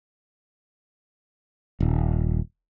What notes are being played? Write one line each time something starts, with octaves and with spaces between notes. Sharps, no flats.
D#1